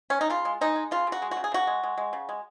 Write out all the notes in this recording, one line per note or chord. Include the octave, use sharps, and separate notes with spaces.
C#4
D#4
C#3 F4
G#3
G#3 D#4
G#3
C#3 F4
C#3
F#4
G#3
F#4
C#3
G#4
C#3 F#4
G#3
G#3
G#3
C#3
G#3